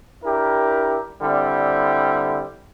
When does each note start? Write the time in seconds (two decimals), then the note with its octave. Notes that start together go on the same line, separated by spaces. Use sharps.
0.24 D4 E4 G4 A#4
1.22 D3 G3 C4 E4